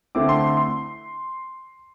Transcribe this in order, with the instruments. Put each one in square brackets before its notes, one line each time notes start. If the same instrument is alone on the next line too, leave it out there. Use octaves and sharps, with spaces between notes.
[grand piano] D3 A3 C4 E4 D6
C6
C6
C6